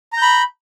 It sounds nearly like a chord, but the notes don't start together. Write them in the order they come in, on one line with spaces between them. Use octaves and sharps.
A#5 G6 B5